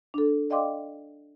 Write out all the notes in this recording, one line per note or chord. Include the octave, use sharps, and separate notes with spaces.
D4 A4
D5 D#5 F5 G5 C6 D6